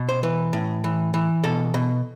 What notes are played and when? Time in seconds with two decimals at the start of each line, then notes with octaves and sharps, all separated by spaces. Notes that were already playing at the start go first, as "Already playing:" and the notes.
Already playing: B2
0.09 C5
0.23 E3 B4
0.53 A2
0.84 E3
1.14 E3
1.44 B2 A4
1.74 B2